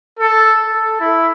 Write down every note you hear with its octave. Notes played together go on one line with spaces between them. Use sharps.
A4
A4
E4